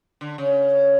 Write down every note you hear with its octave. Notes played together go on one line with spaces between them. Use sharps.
D3
C#3